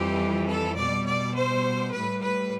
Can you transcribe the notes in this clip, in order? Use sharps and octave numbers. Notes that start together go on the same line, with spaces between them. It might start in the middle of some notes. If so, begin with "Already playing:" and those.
Already playing: F2 E3 G3 G4
A4
B2 G3 D5
D5
C5
A2 G3 B4
B4